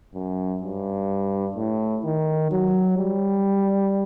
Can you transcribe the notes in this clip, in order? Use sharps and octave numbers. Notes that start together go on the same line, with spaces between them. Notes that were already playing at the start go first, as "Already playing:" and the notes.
F#2
G2
A2
D#3
F#3
G3